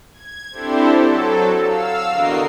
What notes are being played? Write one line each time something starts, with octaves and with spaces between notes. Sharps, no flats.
G#6
C4 D4 E4 G4 A4 C5
F#3 A4
F5 E6
E2 D3 F#4 A#4 D#5 C7